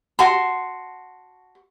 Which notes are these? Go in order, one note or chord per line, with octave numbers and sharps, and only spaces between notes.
F#4 A5 C6